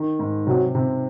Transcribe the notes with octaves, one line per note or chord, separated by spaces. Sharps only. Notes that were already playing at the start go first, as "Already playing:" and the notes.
Already playing: D#3
G#2
C3 F#3
C3